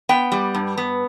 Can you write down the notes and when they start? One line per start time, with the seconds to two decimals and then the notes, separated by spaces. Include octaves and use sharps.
0.09 B3 G5
0.32 G3
0.55 G2
0.77 B3